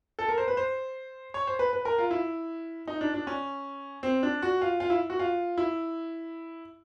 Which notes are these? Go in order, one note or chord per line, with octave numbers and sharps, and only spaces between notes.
A4
A#4
C5
B4
C5
C#5
C5
B4
B4
A#4
F4
E4
D#4
D4
D4
C#4
C4
D4
F#4
F4
F4
E4
F#4
F4
E4